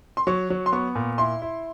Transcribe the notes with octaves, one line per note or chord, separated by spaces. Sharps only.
C6
F#3 C#6
F#3
C6
B3 C#6
A#2
E4 C6
E4